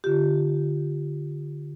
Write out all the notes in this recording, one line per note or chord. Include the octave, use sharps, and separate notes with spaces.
D3 F4 G4